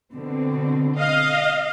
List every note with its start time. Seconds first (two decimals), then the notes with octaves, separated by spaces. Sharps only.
0.14 B2 D3 C4
0.96 D#5 F5